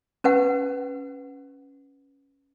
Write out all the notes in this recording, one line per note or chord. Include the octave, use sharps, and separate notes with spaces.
C#4 B4 F#5